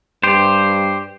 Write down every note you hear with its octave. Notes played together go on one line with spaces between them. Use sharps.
G2 G4 C5